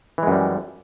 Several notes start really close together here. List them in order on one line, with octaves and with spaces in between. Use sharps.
E3 G#3 F#2 G3